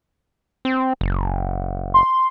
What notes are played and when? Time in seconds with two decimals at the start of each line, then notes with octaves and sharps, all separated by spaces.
0.65 C4
1.01 F#1
1.94 C6